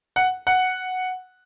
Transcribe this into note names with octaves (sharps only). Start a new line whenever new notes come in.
F#5
F#5